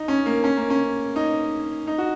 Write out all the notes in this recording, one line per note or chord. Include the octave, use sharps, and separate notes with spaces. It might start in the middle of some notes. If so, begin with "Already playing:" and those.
Already playing: D#4
C#4
A#3
C#4
A#3
C#4
D#4
D#4
F#4